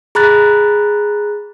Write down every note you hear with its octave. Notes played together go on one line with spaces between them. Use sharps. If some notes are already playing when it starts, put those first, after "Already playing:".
G#4 A#5 B5 F#6 A6